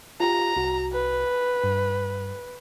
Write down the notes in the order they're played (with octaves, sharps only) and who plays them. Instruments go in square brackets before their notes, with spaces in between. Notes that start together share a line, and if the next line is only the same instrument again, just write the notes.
[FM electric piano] F4 G4 [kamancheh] A#5
[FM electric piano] C2 F#4
[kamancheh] B4
[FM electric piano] G2